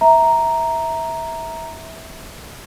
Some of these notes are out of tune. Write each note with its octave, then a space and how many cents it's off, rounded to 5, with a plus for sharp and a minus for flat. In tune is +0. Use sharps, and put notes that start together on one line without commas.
E5 -15 A#5 +0